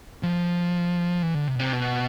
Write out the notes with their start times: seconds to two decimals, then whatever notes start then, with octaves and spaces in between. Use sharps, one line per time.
0.23 F3
1.22 E3
1.34 D3
1.47 C3
1.55 B2
1.59 C3
1.73 B2